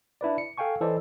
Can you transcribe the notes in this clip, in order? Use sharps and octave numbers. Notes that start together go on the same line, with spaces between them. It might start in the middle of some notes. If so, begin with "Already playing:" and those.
D4 E4 B4 D5
C#7
A4 F5 G5 G#5 C#6
E3 A4 C5 D5 D#5